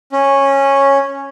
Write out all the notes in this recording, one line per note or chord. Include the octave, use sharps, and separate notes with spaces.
C#4